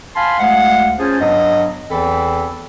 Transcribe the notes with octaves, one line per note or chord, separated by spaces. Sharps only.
F5 G#5 A5 B5 C6
D2 G#3 F5 F#5
C#4 F4 G#4 C5 A5
G2 F#3 B3 D#5
E2 E3 C4 A4 B5